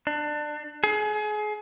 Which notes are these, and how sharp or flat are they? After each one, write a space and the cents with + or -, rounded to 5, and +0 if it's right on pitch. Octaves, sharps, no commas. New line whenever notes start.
D4 +25
G#4 +30